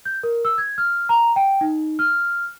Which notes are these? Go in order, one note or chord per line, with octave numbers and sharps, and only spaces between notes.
G6
A#4
E6
G#6
F6
A#5
G5
D#4
F6